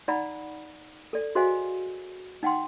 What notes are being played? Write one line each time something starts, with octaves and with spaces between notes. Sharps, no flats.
D#4 D5 F#5 A#5 B5
A4 D5
F#4 G#4 C5 D#5 F5 G#5
D#4 F#5 G5 C6